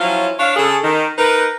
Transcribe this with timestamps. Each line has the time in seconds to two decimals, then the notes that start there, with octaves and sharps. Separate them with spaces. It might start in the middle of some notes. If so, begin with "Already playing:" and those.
0.01 F3 F#3 C#4 E4 F4
0.40 D4 C#5 F5
0.57 C#3 G#4 A4
0.84 D#3
1.18 D#4 A#4 B4